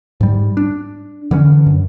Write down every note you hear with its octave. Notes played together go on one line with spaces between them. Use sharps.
G#2 G3
D4
D3 E3 C#4
F#2